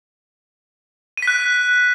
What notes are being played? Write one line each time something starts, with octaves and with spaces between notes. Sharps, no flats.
F#6 B6 D#7